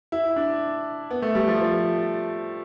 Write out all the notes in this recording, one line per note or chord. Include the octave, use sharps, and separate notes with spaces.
E4
D4
B3
A3
G3
F3
F3